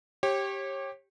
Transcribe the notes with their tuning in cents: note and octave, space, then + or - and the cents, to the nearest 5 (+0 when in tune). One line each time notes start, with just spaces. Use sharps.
G4 +0 C#5 -30